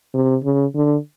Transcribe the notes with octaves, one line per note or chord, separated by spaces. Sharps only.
C3
C#3
D3